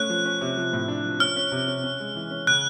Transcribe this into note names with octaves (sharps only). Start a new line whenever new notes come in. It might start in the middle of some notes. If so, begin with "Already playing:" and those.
Already playing: A3 C#4 F#6
F3
C#4
C3
F3
A2
D4
F3
C#4 F6
C#4
C3
C#4
C#4
G#3
E3
C#4
C#3 F#6